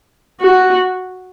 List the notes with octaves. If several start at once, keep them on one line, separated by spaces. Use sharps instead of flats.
F#4